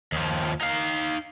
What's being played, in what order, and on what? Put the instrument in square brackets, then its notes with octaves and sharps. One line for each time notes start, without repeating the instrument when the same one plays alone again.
[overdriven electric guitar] D#2 F3
D#4 F5